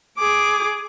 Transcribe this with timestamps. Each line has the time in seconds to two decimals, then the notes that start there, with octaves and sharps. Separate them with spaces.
0.18 G#4 D6